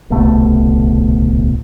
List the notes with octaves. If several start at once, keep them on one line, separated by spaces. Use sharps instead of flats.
D1 C2 B2 A3